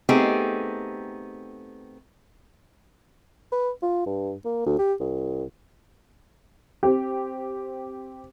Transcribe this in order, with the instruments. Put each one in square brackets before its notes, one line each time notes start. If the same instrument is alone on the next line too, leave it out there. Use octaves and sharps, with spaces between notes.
[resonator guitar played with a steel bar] A3 B3 C4 D#4 G4 G#4
[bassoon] B4
F4
G2
A#3
D2
G4
C2
[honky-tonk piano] C4 G4